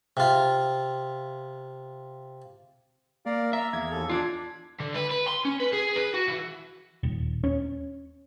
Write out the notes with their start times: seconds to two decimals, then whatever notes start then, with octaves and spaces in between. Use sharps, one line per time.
0.17 C3 F4
3.26 A#3 A#4 D5 F5
3.53 E5 A#5 E6
3.73 E2 A#3 G#6
3.91 D#2 A4
4.09 D4 F4 D5
4.80 D3
4.94 B4
5.11 B4
5.28 C6
5.45 C#4
5.60 B4
5.73 G#4
5.96 B4
6.14 F#4
6.28 E3
7.03 D#1
7.44 C#4